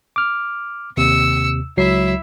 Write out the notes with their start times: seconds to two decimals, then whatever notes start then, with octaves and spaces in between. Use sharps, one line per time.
0.16 D6 F6
0.97 D#2 C3 E6 C#7
1.77 C#2 F#3 E4 E5 C7